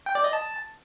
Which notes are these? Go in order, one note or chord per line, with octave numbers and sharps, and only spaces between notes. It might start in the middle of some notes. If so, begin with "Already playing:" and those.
G5
D5
D#5
A5